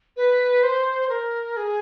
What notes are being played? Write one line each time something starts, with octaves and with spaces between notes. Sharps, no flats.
B4
C5
A#4
G#4